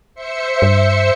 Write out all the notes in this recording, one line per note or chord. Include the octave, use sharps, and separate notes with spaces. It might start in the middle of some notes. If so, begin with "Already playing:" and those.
C5 E5 C#7
G2